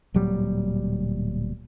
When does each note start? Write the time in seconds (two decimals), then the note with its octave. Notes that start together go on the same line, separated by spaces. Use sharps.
0.14 D1 A#2 F#3 G3